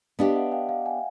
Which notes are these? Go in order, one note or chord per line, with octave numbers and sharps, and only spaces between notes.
B3 D4 G4 D#5 F5
E5 F#5
F5 G5
F5 G5
F#5 G#5